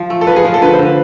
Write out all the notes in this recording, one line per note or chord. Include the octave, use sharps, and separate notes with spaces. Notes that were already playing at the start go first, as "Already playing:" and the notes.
Already playing: F3
A3
A4
F3 B4
G#4
F3 F4
A4
D3 B4
C5
D3
B4